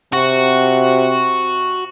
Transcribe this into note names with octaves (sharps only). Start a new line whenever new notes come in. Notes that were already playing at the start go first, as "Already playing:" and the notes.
C3 F#4